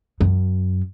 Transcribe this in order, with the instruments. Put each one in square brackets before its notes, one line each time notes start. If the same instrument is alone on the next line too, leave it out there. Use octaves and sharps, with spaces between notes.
[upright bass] F#2